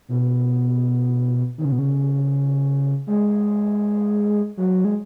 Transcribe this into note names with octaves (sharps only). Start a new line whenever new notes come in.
B2
D#3
C#3
B2
C#3
G#3
F#3
G#3